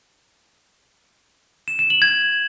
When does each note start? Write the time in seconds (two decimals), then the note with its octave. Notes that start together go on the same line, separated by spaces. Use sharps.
1.68 E7
1.79 E7
1.90 F#7
2.02 G#6